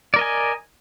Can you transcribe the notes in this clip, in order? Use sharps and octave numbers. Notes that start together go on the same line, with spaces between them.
A#4 D5 D#5 G#5